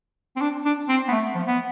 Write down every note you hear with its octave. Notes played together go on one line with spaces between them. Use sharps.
C4
D4
D4
C4
B3
A3
F3
B3